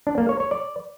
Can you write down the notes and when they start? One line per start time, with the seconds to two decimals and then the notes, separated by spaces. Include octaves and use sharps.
0.07 D4
0.18 A#3
0.29 C#5
0.40 C#5
0.51 D5